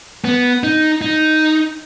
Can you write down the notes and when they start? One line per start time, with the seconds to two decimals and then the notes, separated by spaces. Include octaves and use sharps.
0.24 B3
0.63 D#4
1.02 D#4